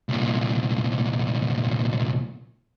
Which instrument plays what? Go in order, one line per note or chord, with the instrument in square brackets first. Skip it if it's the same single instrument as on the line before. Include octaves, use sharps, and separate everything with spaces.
[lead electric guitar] C2 A#2